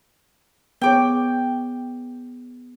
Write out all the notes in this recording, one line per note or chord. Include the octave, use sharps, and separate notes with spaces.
B3 G#4 C#5 G5 D6